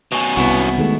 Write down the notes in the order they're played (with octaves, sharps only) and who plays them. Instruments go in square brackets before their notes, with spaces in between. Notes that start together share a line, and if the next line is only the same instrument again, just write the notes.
[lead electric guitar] B2 C#4
[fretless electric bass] C2 [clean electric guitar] B3 E4 F#4
[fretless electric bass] D#3 G#3 A3